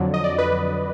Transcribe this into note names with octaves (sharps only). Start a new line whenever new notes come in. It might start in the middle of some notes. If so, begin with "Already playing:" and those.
Already playing: F2 D3 F#3 D5
D#5
D5
B4